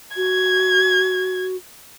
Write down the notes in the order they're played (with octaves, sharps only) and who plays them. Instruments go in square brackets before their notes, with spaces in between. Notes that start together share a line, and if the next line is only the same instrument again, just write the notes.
[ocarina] F#4 [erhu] G#6